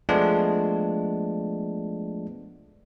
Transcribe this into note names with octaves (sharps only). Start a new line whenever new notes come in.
F3 G#3 A3 B3 D4